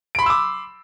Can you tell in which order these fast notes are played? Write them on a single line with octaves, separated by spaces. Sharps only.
D7 B5 C6 E6 D6